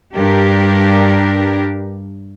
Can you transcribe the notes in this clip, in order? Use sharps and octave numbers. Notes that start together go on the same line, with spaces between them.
G2 D4 G4 A#4